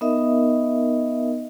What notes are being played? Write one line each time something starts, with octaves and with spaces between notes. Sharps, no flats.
B3 D#4 A#4 D#5 E5